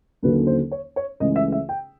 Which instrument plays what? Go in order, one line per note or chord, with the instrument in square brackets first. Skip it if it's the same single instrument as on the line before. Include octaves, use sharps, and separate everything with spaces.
[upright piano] D#2 D3 F#3 A#3 C#4 B4
C5
C#5
C#5
C#2 C#3 E3 A3 D#5
E5
E5
G5